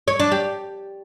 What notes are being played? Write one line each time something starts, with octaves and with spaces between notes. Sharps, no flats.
C#5
D4
G4